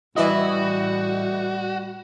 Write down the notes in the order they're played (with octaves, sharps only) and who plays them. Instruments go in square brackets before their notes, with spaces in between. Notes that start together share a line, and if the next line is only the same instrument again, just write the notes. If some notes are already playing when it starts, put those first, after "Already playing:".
[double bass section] A2 [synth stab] E3 E4 D#5 [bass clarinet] G3 [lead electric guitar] F#4